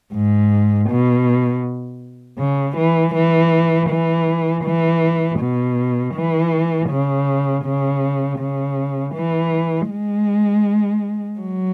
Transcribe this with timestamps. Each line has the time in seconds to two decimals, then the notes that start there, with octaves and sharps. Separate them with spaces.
0.13 G#2
0.89 B2
2.38 C#3
2.76 E3
3.14 E3
3.89 E3
4.64 E3
5.39 B2
6.14 E3
6.89 C#3
7.64 C#3
8.39 C#3
9.14 E3
9.90 G#3
11.40 F#3